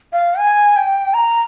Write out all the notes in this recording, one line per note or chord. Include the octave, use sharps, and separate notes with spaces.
F5
G#5
G5
A#5